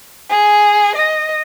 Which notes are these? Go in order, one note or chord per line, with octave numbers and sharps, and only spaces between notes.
G#4
D#5